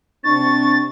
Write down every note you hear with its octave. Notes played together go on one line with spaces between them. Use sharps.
C3 C4 D4 C#6 A6